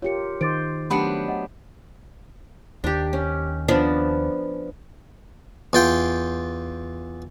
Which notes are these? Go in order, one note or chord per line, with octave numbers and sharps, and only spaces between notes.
F4 G4 A#4 C#5 C#7
D#3 C5 D6 A6 D7
F#3 A3 B3 D4 G4 B5 C#7
D#5 F#5
D#2 D4 G4
C#4
F3 B3 D4
E2 F4 G5